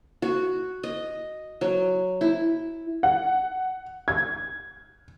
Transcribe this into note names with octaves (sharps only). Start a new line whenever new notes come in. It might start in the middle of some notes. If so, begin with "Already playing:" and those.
F#4
D#5
F#3
E4
F#5
G#6